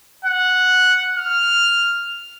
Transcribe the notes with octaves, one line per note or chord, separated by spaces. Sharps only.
F#5
F6